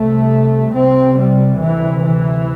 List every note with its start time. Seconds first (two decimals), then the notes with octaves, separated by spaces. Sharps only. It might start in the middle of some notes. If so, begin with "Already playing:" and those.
Already playing: C2 C3 A3
0.72 C2 C3 C4
1.16 G3
1.60 D2 C3 E3
2.05 E3